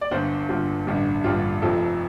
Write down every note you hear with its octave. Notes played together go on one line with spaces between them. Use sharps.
D5
G1 G2 D3 C5
G1 G2 D3 F4
A1 G2 D3 G3
A1 G2 D3 G3 F4
F1 F2 F3 A4